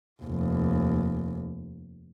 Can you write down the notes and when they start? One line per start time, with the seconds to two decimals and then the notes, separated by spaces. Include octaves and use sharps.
0.22 F1 D#2